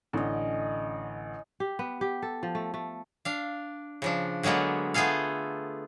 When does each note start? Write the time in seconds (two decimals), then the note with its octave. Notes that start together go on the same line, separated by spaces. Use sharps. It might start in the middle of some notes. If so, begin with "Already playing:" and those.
0.13 A1 D3 C#4 D#5
1.60 G4
1.79 B3
2.01 G4
2.22 A4
2.43 F3
2.55 A3
2.74 A3
3.25 D4 F5
4.02 C#3 F3 D4
4.43 D3 F#3 G#3 A#3 B3
4.94 A3 B3 F4 G#4 A4 F5